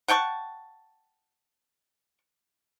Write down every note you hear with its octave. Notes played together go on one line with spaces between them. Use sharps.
F#5 G5 A5 C#6